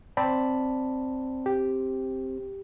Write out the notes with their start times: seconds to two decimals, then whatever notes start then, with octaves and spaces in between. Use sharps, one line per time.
0.17 C4 D5 A5 B5
1.46 G4